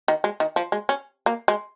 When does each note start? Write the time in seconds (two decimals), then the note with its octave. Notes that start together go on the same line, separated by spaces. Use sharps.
0.08 D#3
0.24 G#3
0.40 D#3
0.56 F3
0.72 G#3
0.89 C#4
1.26 A#3
1.48 G#3